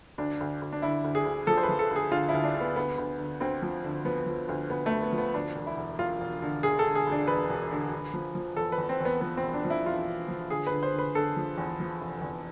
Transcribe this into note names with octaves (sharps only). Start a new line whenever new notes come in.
D2 D4
D2
D2
D4
D3 E4
D2
G#4
D2
F3 A4
C5
B4
F3
A4
D2
G#4
D3 F4
D2 E4
D4
D3
B3
D2 B3
D2
D3
D2 C4
F3
D3
F3 B3
F3
D2
D2 B3
A3
D2
B3
F3
B3
D2 D4
E1
E4
E1
E1 F4
E1
D3
E1 G#4
A4
D3
G#4
D2
D4
E1 B4
E1
D3
D3
F3
F3
E2 A4
B4
E2
C4
E2
B3
F3 B3
C4
E1
D4
F3
E4
E1 F4
E1
F3
D3 G#4
B4
D3
C5
D3
B4
D3 A4
F3
E2
F3
F1
E2